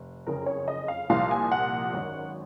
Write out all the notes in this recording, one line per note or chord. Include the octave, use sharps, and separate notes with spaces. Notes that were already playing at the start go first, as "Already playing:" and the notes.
Already playing: F1
F#1 F2 C#3 A#4
C#5
D#5
F5
C2 A#2 F3 F5
G#5
F#5
G#1 F#2 D#3